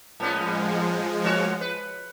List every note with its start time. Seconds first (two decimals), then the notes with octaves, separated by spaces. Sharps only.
0.20 A2 F3 G#3 B3 C#4
1.24 A3 F#4 C#5
1.61 B4